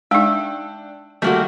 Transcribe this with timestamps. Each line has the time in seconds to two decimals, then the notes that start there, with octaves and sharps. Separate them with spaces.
0.11 G#3 D4 D#4 E5 G5
1.22 G1 D#2 G3 A3 A#3 F#4